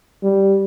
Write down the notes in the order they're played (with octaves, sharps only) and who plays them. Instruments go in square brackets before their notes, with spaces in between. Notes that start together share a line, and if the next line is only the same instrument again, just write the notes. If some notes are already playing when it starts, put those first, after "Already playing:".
[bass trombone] G3